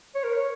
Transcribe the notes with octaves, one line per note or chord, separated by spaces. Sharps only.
C#5
A#4
C#5